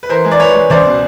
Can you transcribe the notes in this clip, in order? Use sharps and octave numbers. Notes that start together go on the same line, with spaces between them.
B4
E3 A#4 C5
G#3
D5
E3 B4 C#5
G#3
C#2 C5 D5
B2